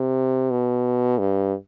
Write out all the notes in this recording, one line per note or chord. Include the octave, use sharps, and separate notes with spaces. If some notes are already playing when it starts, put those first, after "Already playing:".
Already playing: C3
B2
G2